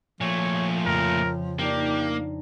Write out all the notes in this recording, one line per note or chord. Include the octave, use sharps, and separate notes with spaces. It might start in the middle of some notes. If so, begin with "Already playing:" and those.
A#2 F3 A3 C#5
F2 C#3 A#4
A#3 D4 D#4 G4 A5